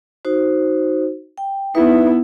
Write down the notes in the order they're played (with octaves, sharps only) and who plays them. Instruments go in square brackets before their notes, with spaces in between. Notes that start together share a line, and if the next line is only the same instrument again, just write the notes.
[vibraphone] D#4 F#4 C5
G5
[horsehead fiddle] B3 E4 [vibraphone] D#4 B4 E5